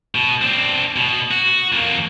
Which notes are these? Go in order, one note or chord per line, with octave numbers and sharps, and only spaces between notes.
B2
C4 D4
B2
F#4
F2 A#3